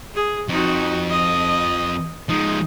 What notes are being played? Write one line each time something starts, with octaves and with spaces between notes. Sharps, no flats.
G#4
F2 D#4 F#4
D#5
F3 G#3 D#4